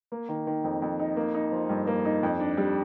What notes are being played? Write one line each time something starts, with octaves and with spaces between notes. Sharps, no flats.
A#3
D#3
D#3
F2
F2
D#4
A#3
D#4
F3
G2
A#3
D#4
F2
D4
G3